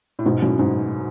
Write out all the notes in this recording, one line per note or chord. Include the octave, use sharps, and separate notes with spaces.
A2
G#2 B2
F#2 A2
G#2